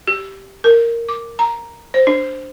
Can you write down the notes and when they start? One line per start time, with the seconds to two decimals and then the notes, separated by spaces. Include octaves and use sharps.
0.08 G4
0.64 A#4
1.09 D6
1.39 A#5
1.94 C5
2.07 D4